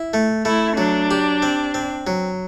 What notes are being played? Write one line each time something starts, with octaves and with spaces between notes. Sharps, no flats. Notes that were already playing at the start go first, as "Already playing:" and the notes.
Already playing: E4
A3
A3 E4
F#3 D4
G4
C4
C4
F#3